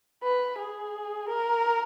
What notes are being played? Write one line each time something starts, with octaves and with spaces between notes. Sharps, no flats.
B4
G#4
A#4